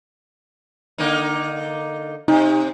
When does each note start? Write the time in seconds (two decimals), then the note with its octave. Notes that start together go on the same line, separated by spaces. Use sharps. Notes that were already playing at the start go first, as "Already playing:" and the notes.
0.98 D3 A#3 D#4
2.28 C3 D#4